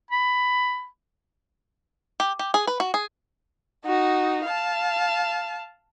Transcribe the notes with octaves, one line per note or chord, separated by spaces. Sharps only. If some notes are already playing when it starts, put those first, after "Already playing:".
B5
G4
G4
G#4
B4
F#4
G#4
D#4 F#4
F5 A5